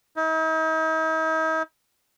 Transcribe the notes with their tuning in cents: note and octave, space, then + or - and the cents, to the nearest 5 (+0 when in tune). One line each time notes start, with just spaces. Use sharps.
D#4 +45